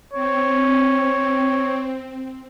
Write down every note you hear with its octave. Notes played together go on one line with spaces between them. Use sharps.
C4 C#5